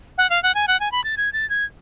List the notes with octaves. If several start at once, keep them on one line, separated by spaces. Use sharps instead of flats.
F#5
F5
F#5
G#5
F#5
G#5
B5
A6
G#6
A6
G#6